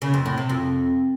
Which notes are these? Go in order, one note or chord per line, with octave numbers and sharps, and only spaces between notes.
C#3
F2
A2
C3
F2